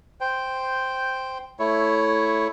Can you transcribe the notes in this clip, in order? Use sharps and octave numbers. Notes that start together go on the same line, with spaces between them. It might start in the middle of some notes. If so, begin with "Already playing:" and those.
C5 G5
A3 E4 C#5